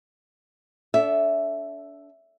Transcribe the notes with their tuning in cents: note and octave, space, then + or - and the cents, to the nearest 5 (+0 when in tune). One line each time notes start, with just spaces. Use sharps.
D4 -35 A4 -10 E5 +0